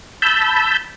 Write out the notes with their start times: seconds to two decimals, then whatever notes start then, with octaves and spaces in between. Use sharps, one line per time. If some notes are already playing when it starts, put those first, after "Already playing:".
0.22 A5 B5 E6 G6